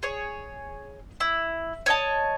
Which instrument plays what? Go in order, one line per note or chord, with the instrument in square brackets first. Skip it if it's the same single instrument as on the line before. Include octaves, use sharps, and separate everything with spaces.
[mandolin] G#4 C#5
E4
C#5 D#5 A5